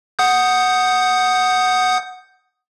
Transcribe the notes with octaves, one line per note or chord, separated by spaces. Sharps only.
F#5 D#6 G6